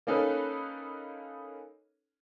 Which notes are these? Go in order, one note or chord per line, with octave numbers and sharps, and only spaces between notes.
A#3 C#4 D#4 A4 B4